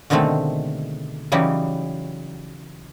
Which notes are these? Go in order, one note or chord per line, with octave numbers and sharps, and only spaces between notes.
B2 D3 D#3 G#3 A3 C4
C#3 E3 F#3 G3 D#4